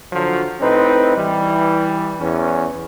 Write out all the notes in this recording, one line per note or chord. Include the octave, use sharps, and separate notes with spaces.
D3 F3 F#3
A2 C4 D#4 B4
E3 G3
E2 C#4